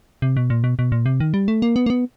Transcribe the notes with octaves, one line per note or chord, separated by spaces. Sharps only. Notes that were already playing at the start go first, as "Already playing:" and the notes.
C3
B2
A#2
B2
B2
A#2
C3
D#3
G3
A3
A#3
B3
A#3
B3